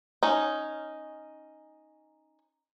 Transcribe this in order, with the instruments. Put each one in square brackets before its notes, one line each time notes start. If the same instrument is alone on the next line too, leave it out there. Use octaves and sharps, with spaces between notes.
[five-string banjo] C#4 D#4